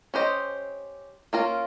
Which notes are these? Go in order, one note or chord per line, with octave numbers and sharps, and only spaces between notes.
C#4 G4 C5 D#5
A#3 C#4 F4 A#4